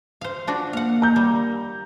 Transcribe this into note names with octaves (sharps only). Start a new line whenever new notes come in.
C5 F5
F3 D4 F#4
A#3 F5 F#5
A#5 G6
G3